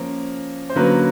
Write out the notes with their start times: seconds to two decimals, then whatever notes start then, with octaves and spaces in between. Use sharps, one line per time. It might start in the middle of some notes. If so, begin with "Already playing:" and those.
Already playing: F3 A#3 C#4
0.70 C5
0.75 D3 F#3 A#3 C#4 B4